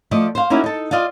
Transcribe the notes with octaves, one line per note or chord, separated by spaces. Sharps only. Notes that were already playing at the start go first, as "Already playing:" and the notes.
F3 A3 D5 D#5
C5 F5
A#3 C#4 D#4 E4 F#4
D#4 A4
F4 D5 D#5 F5